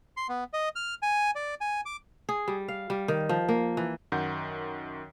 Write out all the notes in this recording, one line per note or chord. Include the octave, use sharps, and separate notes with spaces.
C6
B3
D#5
F6
G#5
D5
G#5
D6
G#4
G3
F5
G3
D#3
F3
A#3
E3
F#2 D#3 F#5 G6